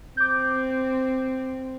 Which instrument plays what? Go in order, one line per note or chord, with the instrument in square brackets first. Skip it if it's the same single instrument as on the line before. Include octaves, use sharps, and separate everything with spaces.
[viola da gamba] C4 [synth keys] D6 G6